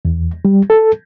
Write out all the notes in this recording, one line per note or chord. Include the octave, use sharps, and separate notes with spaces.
E2
G3
A4